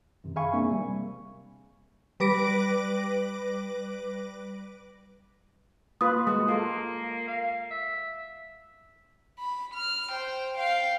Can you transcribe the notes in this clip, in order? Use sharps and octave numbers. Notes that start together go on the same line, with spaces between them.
F#2 C3 D#3
G#4 E5 F5 G#5 B5 C#6
F3 G#3 A#3 C4 D4
C3 G3
G3 B4 D6 A#6 D7
A#3 F4 B4 D#6
G#3 F#4
A#3 F4 A4
F5
E5
B5
F6
C5 G5
F5 G5